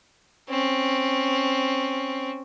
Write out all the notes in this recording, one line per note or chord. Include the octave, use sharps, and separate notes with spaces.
C4 C#4